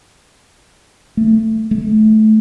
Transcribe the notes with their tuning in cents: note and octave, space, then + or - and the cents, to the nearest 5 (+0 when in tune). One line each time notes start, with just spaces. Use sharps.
A3 +15
A3 -20